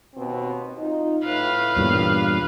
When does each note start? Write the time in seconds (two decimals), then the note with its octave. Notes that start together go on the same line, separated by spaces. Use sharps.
0.15 D#2 B2 C4
0.78 D#4 F4
1.24 A2 B4 F5
1.76 E2 G2 A#2